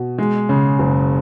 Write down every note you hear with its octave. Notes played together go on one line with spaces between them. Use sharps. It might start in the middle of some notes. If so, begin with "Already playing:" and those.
Already playing: B2
G#3
C#3
F#1